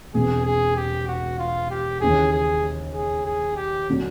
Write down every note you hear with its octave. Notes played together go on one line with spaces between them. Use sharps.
E1 E2 C3 G#4
G#4
G4
F#4
F4
G4
D#2 C#3 E3 G#4
G#4
G#4
G#4
G4
D3 F#3